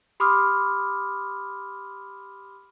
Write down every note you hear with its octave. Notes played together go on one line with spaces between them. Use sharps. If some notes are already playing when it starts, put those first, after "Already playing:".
G4 B5 C6 D6 D#6 F6